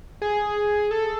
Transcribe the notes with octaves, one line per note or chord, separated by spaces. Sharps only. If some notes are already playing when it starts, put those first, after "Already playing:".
G#4
A4